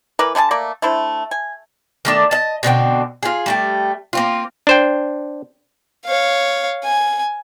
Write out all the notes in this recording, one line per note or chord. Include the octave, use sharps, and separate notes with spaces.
E3 A#4 B4 D5
D3 A3 G#5 A5
A3 A#3 D5
A3 D4 E4 C5
G#5
D#3 A3 D4
D#5 A5
B2 D3 C4 G5
F4 G#4
G3 A3 G5
A#3 C4 F4
D4 C5 G5
C#5 F5
G#5